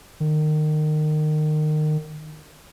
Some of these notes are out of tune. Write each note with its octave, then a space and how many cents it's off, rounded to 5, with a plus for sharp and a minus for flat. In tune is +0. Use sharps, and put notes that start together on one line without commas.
D#3 -25